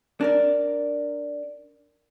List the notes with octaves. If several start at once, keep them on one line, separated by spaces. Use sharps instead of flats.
D4 A#4 D5